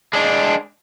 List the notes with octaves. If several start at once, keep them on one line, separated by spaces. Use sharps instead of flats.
G#3 D4